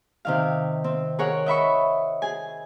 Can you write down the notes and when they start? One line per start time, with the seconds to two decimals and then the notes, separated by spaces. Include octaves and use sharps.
0.25 C3 D#3 F5
0.84 C4
1.19 G#4 A#4 C#5 F#5
1.46 D#5 E5 B5 C#6
2.22 G#4 G#5